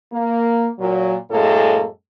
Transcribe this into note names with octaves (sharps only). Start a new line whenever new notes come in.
A#3
A#2 F#3
F#2 A2 G#3 A#3 A4